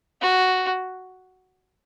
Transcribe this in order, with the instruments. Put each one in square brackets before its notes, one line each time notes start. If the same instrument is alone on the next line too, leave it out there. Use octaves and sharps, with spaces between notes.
[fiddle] F#4